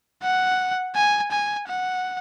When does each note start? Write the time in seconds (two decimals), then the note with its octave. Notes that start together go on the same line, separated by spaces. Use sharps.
0.23 F#5
0.95 G#5
1.31 G#5
1.68 F#5